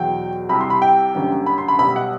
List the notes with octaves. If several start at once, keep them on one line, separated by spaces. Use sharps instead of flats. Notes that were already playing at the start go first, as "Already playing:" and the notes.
Already playing: E2 B2 F#3 G5
C2 C3 G3 B5
C6
B5
G5
F#1 F#2 D3 G3
B5
C6
B5
B1 B2 G3 B5
F#5